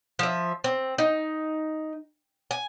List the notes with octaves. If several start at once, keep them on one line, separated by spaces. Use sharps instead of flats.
F3 E5
C4
D#4
G#5